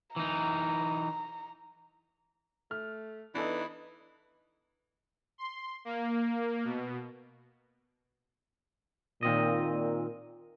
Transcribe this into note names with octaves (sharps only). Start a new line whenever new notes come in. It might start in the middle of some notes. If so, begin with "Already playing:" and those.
E3 D#4 A#5
A3 F6
E3 B3 D4 D#4 A4 B5
C6
A#3
B2
A#2 D#3 C4 D#5